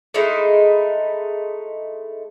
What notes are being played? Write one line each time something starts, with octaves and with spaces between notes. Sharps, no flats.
G#3 A3 D#4 E4